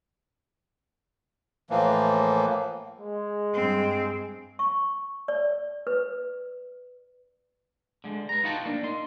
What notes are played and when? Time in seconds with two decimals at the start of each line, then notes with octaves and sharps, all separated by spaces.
1.70 A2 E3 F3 A#3
3.00 G#3
3.54 G2 C4
4.59 C#6
5.28 D5
5.87 B4
8.04 D3 G#3
8.29 B4 A#5
8.44 D#4 F4 F#4 G5 A5
8.66 A#3 D4
8.83 D#4 C6